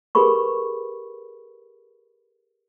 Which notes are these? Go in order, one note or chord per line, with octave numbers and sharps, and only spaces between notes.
G4 G#4 A#4 B4 B5 C#6